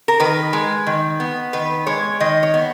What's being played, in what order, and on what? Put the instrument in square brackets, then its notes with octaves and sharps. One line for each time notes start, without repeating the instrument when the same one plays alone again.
[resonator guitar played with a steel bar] A#4
D#3 B4
G#3
D#3
B3
D#3 B4
G#3 C#5
D#3 D#5
C#5
B3